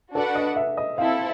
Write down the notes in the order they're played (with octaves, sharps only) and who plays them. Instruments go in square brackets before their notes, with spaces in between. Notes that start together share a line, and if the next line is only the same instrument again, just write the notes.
[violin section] D4 F#4 B4 D5 F#5 [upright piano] A4
[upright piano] D#5
E5
D#5
[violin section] C4 E4 A4 [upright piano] F5